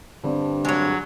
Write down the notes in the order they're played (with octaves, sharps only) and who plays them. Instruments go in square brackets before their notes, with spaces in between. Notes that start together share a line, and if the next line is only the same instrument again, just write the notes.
[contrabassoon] G2 [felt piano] D3 C4 D4
[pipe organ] F#3 [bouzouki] G#3 C#5